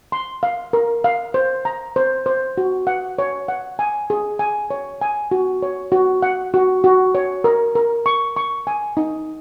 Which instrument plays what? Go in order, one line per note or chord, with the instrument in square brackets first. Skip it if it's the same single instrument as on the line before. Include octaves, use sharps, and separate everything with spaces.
[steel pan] C6
F5
A#4
F5
C5
A#5
C5
C5
F#4
F#5
C#5
F#5
G#5
G#4
G#5
C#5
G#5
F#4
C#5
F#4
F#5
F#4
F#4
C#5
A#4
A#4
C#6
C#6
G#5
D#4